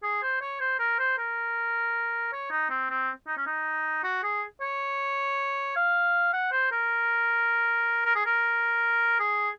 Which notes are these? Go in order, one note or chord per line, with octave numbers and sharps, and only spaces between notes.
G#4
C5
C#5
C5
A#4
C5
A#4
C#5
D#4
C4
C4
D#4
C#4
D#4
F#4
G#4
C#5
F5
F#5
C5
A#4
A#4
G#4
A#4
G#4